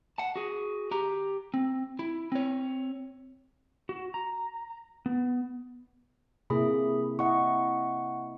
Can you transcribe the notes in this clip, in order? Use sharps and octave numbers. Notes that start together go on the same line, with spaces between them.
F#5 A5
F#4 G#4
G4 A#5
C4
E4
C4 C#5
F#4
A#5
B3
C3 A#3 E4 G#4 B5
E4 D#5 F#5 C#6